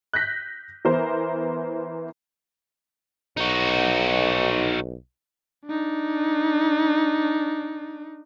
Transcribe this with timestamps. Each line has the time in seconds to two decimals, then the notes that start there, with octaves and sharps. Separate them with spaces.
0.13 F#6 G6 A#6 B6
0.85 E3 B3 A#4 C5
3.37 B1 D#4 F#4
5.66 D4 D#4